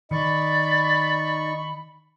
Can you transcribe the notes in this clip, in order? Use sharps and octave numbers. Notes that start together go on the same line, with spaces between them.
D#3 D#4 D5 B5 C#6